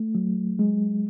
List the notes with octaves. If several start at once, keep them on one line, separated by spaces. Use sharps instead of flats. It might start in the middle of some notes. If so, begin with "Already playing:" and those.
Already playing: A3
F#3
G#3